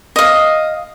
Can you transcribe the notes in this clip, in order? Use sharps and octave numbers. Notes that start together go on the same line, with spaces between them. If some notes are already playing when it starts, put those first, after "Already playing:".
D#5 F5